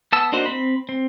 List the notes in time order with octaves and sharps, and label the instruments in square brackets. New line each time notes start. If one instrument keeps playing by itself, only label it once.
[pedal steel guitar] B3 A5 E6
A#3 D4 D#4 F#4 C5
C4 B5
C4